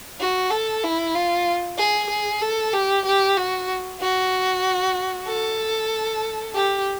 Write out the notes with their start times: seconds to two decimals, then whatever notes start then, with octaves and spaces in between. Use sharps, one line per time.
0.20 F#4
0.51 A4
0.84 E4
1.15 F4
1.78 G#4
2.10 G#4
2.41 A4
2.73 G4
3.05 G4
3.37 F#4
4.01 F#4
5.27 A4
6.55 G4